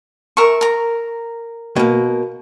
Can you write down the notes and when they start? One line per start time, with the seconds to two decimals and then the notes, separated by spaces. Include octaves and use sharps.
0.37 A#4 E5 C#6
0.61 A#4 A#5
1.76 B2 A#3